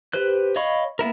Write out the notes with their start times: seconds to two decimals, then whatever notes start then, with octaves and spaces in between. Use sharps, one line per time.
0.13 G4 B4 C5 F#6
0.56 C#5 D#5 F5 B5 C#6
0.99 A#3 B3 E4 A#4